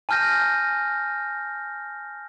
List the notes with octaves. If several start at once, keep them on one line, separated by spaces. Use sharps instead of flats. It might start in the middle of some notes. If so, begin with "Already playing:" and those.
G#5 A5 F6 G6 A#6